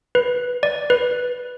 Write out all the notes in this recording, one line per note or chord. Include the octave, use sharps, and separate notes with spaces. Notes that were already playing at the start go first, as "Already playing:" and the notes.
B4
D5
B4